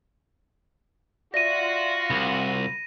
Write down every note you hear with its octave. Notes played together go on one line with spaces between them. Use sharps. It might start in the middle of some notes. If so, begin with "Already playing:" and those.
F4 F#4 D5 E5 A#6 D#7
C2 B5